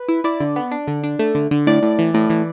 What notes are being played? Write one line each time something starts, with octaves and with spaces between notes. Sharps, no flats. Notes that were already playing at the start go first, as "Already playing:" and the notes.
Already playing: B4
E4
E4 D5
D3
B3
D4
D3
D4
A3
D3
D3
A2 D5
A2
E3
A2
E3